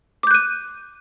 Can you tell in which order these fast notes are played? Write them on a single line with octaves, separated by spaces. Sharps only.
D6 G6 F#6 D#7